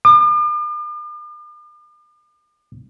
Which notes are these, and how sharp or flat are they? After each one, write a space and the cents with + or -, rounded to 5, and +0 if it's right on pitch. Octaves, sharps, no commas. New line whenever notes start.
D6 +45